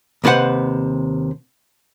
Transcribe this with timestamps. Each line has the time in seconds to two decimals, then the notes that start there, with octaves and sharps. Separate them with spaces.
0.24 D#2 C3 B4 C5 F#5